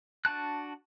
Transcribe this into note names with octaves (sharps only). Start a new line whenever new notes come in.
D4 F#4 A5 F#6